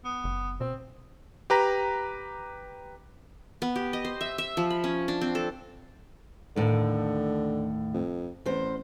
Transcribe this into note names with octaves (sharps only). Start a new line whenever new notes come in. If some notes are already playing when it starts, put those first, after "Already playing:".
B3
F#1
B2 C4
G4 B4 A#5
B3
G4
D#5
C5
E5
E5
F3
B5
C#4
D4
C4
A4
D#2 A2 D3
F2
A1 E2 C5